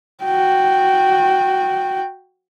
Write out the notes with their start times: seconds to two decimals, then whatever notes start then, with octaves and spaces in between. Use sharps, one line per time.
0.24 F#4 G5